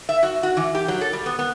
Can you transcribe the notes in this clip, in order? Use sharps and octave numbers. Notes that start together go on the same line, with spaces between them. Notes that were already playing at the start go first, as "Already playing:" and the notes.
E5
F#4
F#4
E3
G4
F#3
A4
G3
B3
B3